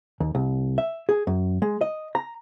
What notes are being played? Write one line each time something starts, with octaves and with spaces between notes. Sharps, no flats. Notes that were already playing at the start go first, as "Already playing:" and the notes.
D#2
C2
E5
G#4
F#2
G#3
D#5
A#5